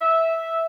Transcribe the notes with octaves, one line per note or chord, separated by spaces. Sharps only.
E5